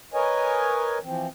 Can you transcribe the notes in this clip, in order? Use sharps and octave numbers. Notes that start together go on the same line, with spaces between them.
A#4 B4 C#5 D#5 G#5
E3 F3 C4